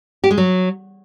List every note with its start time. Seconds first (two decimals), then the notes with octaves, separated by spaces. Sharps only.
0.24 G4
0.31 G#3
0.38 F#3